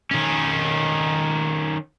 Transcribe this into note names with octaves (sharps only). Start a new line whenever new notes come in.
D#3 C#4